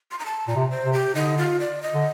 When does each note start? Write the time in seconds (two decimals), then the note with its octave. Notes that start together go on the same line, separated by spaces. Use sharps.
0.11 C6
0.19 A#5
0.26 A5
0.48 A#2 A#5
0.56 C3
0.71 C5
0.86 C3
0.93 G4
1.15 D3 D#4
1.38 F4
1.60 D5
1.83 D#5
1.94 D3